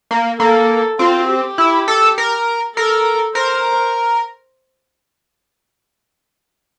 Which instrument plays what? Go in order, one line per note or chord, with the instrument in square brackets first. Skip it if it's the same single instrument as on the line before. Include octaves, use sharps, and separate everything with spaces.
[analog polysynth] A#3
[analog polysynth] A#3 [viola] A4
[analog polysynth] C4 [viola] F4
[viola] G4
[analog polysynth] E4
A4
A#4
[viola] A4 [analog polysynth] A#4
[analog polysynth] A#4 [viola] C5